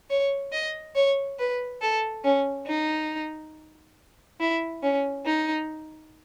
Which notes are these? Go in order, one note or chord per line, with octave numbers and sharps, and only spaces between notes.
C#5
D#5
C#5
B4
A4
C#4
D#4
E4
C#4
D#4